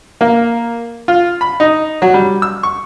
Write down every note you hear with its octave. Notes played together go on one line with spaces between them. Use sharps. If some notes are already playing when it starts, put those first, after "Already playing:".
A#3
F4
B5
D#4
F#3
G3
E6
C#6